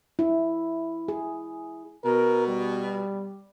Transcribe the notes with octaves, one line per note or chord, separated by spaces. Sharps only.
E4
G#4
B2 A#4
G3